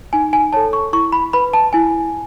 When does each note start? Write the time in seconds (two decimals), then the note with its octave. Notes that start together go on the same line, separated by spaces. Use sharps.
0.13 D#4 G#5
0.33 G#5
0.53 A4 C#5 A5
0.73 C#6
0.93 E4 C#6
1.12 B5
1.33 B4 B5
1.54 A5
1.73 E4 G#5